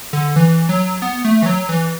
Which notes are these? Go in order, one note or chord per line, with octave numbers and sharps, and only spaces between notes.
D3
E3
F#3
B3
A3
E3
F#3
E3